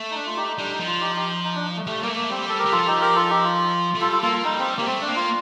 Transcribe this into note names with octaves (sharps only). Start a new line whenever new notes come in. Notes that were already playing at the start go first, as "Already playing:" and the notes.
Already playing: A3
D#4
D4
F4
D#4 G4
D#4
G3 D4
D#4
F3
F4
D#4 G4
D#4 G4
D#4
D#4
D4
A3
G3 A3
G3 A#3
A3
A#3
G3 C4
A4
G4 A#4
G3
F3 F4 A4
D#4 G4
G4 A#4
F4 A4
D#4 G4
F4
A3
G3 F4 A4
F4 A4
A#3 F4 A4
F4
G3 D#4
C4
G3 A#3
A3 C4
D4
A#3
F4